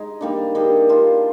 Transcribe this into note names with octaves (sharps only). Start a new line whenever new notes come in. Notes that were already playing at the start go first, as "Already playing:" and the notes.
Already playing: G#3 D#4 G#4
D#3 G3 A#3 D4
D#3 G3 D4 G#4
G3 D4 F4